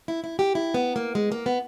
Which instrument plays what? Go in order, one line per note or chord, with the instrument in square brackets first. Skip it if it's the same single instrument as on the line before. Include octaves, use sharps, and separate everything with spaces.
[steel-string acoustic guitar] E4
E4
G4
E4
B3
A#3
G#3
A#3
B3